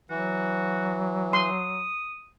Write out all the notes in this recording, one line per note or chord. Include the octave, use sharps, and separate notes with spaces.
E3 F#3 F#4
C6 D#6